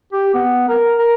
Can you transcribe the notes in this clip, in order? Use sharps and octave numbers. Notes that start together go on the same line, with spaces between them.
G4
B3
A#4
A#4